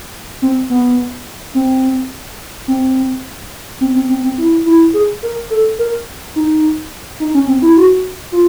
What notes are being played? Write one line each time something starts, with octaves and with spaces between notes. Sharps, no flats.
C4
B3
C4
C4
C4
C4
C4
C4
E4
E4
G#4
A#4
A4
A#4
D#4
D#4
C#4
C4
E4
F#4
F4